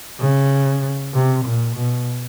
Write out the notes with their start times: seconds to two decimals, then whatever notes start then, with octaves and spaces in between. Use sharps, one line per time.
0.19 C#3
1.14 C3
1.45 A#2
1.75 B2